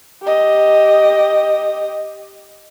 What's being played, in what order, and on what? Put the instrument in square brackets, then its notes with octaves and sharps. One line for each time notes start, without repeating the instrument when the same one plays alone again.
[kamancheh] G4 D#5